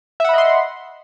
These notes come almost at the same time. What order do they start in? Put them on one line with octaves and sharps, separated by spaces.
E5 F#5 B5 D#5 C6